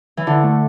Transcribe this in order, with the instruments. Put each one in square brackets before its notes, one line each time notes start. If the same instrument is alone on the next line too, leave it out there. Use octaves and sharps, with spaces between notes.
[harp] E3
[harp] D3 [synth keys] E4
[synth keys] A3